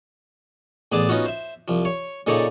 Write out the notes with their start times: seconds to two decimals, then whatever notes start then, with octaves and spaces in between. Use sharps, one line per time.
0.92 A1 B3 G#4 D5 A5
1.09 B3 C#4 D#4 F4 F#4
1.26 C5 E5
1.68 C2 F3
1.85 C#5
2.27 A#2 C#3 D#4 A4 C#5 D5